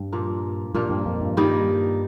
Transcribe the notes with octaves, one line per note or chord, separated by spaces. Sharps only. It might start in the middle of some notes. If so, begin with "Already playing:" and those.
Already playing: G2
A#2 F3 A#3
G2 A#2 F3 A#3
G2
F2
G2
D#3 G3 A#3 D#4